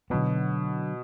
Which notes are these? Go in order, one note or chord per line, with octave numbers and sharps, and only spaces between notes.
B2 D3 F#3 B3